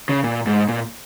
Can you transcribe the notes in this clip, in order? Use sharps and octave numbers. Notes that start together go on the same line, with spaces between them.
C#3
A#2
G#2
A#2